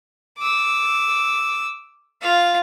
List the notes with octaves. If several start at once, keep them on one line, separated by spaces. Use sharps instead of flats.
D6 E6
F4 F5